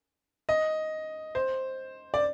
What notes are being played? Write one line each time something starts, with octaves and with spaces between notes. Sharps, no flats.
D#5
C5
D5